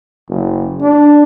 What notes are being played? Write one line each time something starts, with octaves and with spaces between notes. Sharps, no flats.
F#1
D4